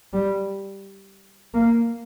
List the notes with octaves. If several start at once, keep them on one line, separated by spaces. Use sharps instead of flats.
G3
A#3